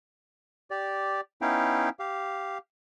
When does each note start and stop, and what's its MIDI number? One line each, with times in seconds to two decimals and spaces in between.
0.71 1.21 67
0.71 1.21 74
1.42 1.89 59
1.42 1.89 61
1.42 1.89 63
1.42 1.89 64
1.42 1.89 77
1.42 1.89 79
1.99 2.58 67
1.99 2.58 77